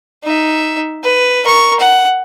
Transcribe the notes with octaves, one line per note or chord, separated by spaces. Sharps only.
D#4 E5
B4
A#4 C#6
F#5